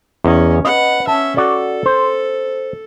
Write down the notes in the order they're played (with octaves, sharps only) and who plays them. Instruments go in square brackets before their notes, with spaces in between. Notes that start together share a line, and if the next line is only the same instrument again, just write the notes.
[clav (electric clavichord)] E2 D#5 [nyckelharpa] C#4
[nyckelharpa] B4 F#5 [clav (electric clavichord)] D#5
[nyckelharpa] C#4 E5 [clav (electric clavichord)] A5
[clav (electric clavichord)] F#4 D5 [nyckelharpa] A4
[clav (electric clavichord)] C5